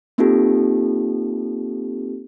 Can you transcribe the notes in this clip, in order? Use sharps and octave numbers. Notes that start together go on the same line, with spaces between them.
A#3 C4 D#4 F4 G4 A4